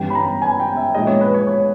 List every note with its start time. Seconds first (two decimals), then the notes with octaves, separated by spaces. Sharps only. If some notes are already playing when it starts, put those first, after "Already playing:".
Already playing: G1 G2 E3 G3 C#4 G5
0.10 B5
0.15 A#5
0.42 G#5
0.60 G5
0.77 E5
0.95 A#1 A#2 G#3 D#5
1.07 C#5
1.21 B4
1.34 C#5
1.47 C#5